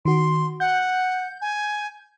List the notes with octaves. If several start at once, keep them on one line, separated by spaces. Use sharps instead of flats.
D#3 F#4 C6
F#5 G6
G#5